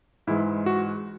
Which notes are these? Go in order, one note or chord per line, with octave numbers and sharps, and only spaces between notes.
G#2 E3 G#3 E4
F#4